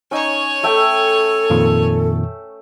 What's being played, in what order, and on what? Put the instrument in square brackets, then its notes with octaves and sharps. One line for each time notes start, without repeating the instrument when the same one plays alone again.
[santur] C#4 D#4 [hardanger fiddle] C#5 G#5
[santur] A3 E5 G5 [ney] A4
[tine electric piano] F2 A#2 D#3